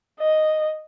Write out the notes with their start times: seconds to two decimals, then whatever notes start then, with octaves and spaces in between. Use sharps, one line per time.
0.20 D#5